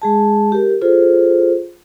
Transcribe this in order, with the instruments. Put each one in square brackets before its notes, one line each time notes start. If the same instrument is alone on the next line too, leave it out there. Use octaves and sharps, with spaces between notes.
[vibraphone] G#3 G#4 A5
G4 A#4
F4 G#4 A4 C5